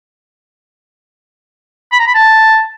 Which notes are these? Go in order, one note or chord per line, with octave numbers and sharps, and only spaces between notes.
B5
A#5
B5
A5